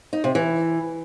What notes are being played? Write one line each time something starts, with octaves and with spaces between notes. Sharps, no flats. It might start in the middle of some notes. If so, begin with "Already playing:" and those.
D#4
C3
E3